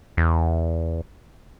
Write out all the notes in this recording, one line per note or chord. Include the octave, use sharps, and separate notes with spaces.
E2